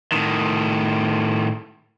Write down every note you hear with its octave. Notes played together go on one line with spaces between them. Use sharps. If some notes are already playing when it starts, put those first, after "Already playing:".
A2 D#3